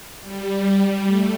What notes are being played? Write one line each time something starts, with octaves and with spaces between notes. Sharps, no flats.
G3
A3